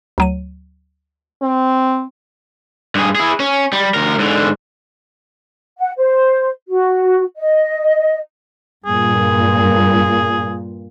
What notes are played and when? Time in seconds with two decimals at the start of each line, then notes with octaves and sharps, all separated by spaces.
0.18 D2 F#3 D#7
1.42 C4
2.95 G2 G#4
3.15 E4 G#4
3.40 C#4
3.73 G3
3.94 D2 A#4
4.19 G#2 D3
5.78 F#5
5.97 C5
6.69 F#4
7.37 D#5
8.86 G2 A#2 G#4